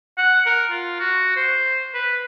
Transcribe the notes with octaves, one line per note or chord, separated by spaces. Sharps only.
F#5
A#4
F4
F#4
C5
B4